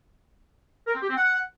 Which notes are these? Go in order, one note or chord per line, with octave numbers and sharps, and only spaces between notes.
A#4
C4
G4
C4
F#5